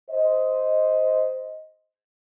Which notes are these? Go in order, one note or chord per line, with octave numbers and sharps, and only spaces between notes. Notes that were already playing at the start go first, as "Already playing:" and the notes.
C5 D#5